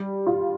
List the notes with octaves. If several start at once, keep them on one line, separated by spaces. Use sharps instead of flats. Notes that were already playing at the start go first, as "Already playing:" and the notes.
Already playing: G3
F4